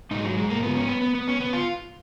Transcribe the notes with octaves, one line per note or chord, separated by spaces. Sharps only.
G#2 F#3 D#4
F#3
G#3
A#3
B3
C#4
B3
B3
B3
C#4
B3
F4